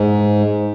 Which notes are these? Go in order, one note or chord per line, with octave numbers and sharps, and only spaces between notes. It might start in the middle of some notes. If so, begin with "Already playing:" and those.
Already playing: G#2